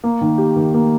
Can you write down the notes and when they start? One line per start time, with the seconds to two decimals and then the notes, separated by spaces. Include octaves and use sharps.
0.04 A#3
0.21 D#3
0.38 G4
0.56 D#3
0.74 A#3